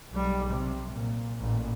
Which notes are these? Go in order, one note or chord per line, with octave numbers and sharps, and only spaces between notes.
B1 G3
C3
A#2
A1 A#2